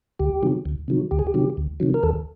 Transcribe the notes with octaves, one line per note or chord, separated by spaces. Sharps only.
D2 G4
C3 D#3 F#3
D2
C3 D#3 F#3
D2 G4
G#4
G4
C3 D#3 F#3
D2
C3 D#3 F#3
A#4
D#2 A4